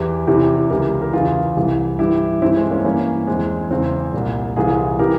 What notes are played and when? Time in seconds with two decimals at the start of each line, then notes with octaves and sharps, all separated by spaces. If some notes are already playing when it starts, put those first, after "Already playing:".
Already playing: E2 E3 E4 G4
0.27 E2 C3 E3 E4 G4
0.70 C#2 C#3 E3 G4 A#4
1.02 A#4
1.13 E2 C#3 E3 F4 G#4
1.56 C2 C3 E3
1.99 G2 E3 E4 G4
2.42 E3 C4 E4
2.45 G2
2.56 G#3 C4
2.70 A#3 C#4
2.85 G2 E3 A#3 C#4
3.27 E2 E3 G#3 C4
3.70 E2 C#3 E3 G#3 C4
4.13 C2 A#2
4.56 C2 C3 E3 F4 G#4
4.99 C3 E3 G4 A#4